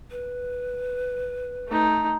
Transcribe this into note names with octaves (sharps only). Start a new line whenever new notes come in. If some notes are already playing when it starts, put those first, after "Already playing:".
B4
A3 D#4